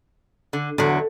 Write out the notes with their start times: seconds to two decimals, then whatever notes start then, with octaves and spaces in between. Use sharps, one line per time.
0.53 D3
0.78 E2 D3 F#3